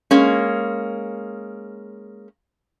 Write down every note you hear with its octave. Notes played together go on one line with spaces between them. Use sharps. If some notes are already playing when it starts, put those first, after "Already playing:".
G#3 A#3 C#4